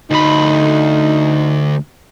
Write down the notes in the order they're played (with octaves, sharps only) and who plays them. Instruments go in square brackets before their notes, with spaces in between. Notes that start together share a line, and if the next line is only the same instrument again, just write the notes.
[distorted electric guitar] D2 B5 [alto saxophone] D#4